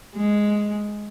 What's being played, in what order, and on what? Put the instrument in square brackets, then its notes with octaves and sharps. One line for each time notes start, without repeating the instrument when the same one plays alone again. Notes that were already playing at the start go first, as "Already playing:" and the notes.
[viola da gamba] G#3